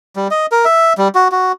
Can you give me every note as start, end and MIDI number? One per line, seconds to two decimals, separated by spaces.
0.16 0.28 55
0.31 0.46 75
0.52 0.65 70
0.65 0.93 76
0.98 1.08 55
1.15 1.28 66
1.32 1.52 66